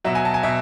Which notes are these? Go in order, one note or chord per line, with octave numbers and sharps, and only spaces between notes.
B2 F#3 E5
G#5
A5
G#5
B2 E5